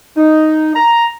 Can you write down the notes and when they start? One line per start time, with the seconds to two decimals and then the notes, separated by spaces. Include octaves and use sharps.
0.17 D#4
0.75 A#5